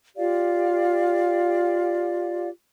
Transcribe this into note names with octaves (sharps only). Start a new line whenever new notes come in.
F4 G4 D5 F5